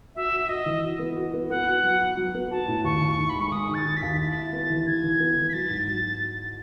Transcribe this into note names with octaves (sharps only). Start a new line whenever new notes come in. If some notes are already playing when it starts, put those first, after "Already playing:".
F#4 E5
F#4
E5
F#4 D#5
E3
F#4
B3
F#4
B3
B3 F#5
F#4
F#3
F#4
F#3
B3
F#4 A5
A2
D#2 C#6
D#2
D#3
B5
G#3
C#6
G#3 D#6
D#3
A6
D#3
B6
D#2
B6
E4 A6
E4
B3
E3
E3 G#6
E3
B3
E3
B6
F#3 A6
G#2
F#3 A6